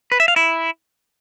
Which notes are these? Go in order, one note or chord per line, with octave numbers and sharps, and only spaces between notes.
B4
E5
F5
E4